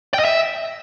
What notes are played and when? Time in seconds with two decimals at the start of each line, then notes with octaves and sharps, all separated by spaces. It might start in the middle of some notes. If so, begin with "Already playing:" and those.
0.14 G5
0.19 D#5
0.25 E5